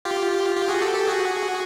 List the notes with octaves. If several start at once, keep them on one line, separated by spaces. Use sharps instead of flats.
F4 G4
F4 G4
F#4 G#4
G4 A4
G4 A4
F#4 G#4